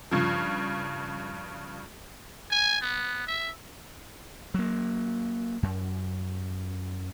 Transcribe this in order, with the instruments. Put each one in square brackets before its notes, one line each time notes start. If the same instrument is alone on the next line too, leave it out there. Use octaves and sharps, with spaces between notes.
[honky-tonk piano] G2 C#3 F3
[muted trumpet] G#5
B3
E5
[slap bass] F#3 A#3
F#2